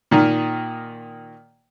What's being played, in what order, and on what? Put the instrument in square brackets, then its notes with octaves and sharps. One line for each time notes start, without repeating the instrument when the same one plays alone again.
[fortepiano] A#2 D#3